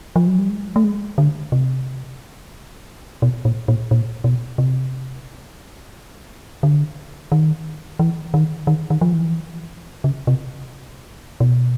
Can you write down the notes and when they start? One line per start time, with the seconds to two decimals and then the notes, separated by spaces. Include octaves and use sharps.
0.16 F3
0.27 F#3
0.39 G3
0.50 G#3
0.76 A3
0.84 G#3
1.18 D3
1.52 C3
3.22 B2
3.45 A#2
3.68 A#2
3.91 A#2
4.24 B2
4.58 C3
6.63 D3
7.32 D#3
7.99 E3
8.34 D#3
8.67 D#3
8.90 D#3
9.01 F3
9.13 E3
10.04 C#3
10.27 C3
11.40 B2